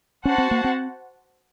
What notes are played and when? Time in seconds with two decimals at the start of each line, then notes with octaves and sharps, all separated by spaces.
0.24 C#4 F#4 C5 F#5 A5
0.38 C4
0.51 A#3
0.64 C4